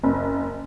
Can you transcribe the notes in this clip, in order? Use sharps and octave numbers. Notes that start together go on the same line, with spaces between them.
F#1